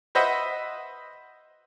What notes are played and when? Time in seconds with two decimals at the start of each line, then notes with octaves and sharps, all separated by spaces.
0.15 B4 C5 D#5 E5 F#5